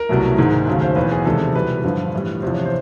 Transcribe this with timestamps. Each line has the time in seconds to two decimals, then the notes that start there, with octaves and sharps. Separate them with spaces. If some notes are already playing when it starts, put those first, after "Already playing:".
Already playing: A#4
0.09 C2 B2 F#3 A3
0.38 G#2 D#3 G#3
0.67 D#2 C#3 F#3 A3
0.82 C5
0.96 E2 B2 F#3 B4
1.11 G#4
1.25 E2 C3 D#3 G#3 A4
1.55 E2 B2 G3 B4
1.84 G2 D3 F3
2.14 A2 E3 G3
2.42 E2 C3 F3 C5
2.54 C#5
2.65 C5